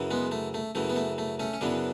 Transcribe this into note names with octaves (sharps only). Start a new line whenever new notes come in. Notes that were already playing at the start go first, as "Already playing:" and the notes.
Already playing: F#2 C#3 E3
G#3 B3
A3
A3
F#2 C#3 E3 A3
B3
A3
A3
A3 C#4
C#4
F#2 C#3 E3 B3 D4